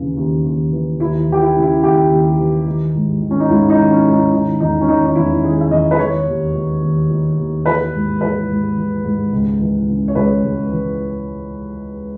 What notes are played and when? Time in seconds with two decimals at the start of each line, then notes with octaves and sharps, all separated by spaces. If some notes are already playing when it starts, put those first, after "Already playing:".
Already playing: D#2 C#3 E3
0.17 D#2
0.45 D#2
0.72 E3
1.00 D#2 E4
1.28 E3 G4
1.42 E4
1.56 C#3
1.63 E4
1.83 D#2 G4
2.11 D#2
2.39 E3
2.66 D#3
2.94 G#2
3.22 D#3
3.31 C#4
3.40 D#4
3.49 G#2 E4
3.70 D#4
3.78 D#3
3.91 C#4
4.05 G#2
4.12 D#4
4.33 D#3 D#4
4.60 E2 D#4
4.81 C#4
4.88 D#3 D#4
5.06 D#4
5.15 E2 E4
5.44 D#3 G#4
5.61 E5
5.71 E2 D#5
5.91 B4
5.99 D#3 C#5
6.27 D#2
6.54 D#3
6.82 D#2
7.10 D#3
7.38 D#2
7.66 E3 B4
7.93 G#2
8.21 E3 B4
8.49 G#2
8.76 E3
9.04 G#2
9.32 C#2
9.60 E3
9.88 C#3
10.08 C#5
10.15 C#2 B4
10.43 C#2
10.71 E3